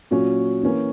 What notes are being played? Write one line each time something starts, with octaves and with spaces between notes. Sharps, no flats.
A#2 F#3 C#4
E3 A#3 C#4